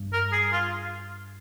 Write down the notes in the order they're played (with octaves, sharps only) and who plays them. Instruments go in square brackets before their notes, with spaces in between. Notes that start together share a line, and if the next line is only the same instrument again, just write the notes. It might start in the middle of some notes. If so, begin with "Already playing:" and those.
Already playing: [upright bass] G2
[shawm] A#4
G#4
F4